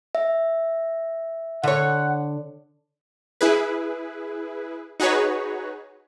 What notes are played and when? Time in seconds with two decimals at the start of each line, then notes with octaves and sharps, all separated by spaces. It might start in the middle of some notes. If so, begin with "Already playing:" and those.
0.15 E5
1.63 D3 C#5 F#5
3.41 E4 G#4 B4
5.00 D#4 F#4 G#4 B4 C#5